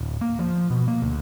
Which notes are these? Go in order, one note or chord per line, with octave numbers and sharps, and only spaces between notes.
D1
A#3
F3
B2
A#3
D2